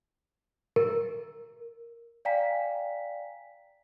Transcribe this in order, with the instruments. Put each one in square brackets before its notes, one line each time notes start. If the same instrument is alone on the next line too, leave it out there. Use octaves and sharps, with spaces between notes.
[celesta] A#4
D5 F5 G5 G#5 A#5 B6